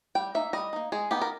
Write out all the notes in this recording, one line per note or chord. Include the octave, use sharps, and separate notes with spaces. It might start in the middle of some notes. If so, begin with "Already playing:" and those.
G3 G5
A#3 D#4 E5
G3 D#5
A#3 D#4
G#3 G#4
B3 D#4 G4
A#4